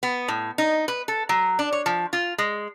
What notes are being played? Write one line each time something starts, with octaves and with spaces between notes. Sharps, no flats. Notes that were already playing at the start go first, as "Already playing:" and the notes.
B3
A2
D#4
B4
A4
F#3
D4
C#5
F3
F4
G#3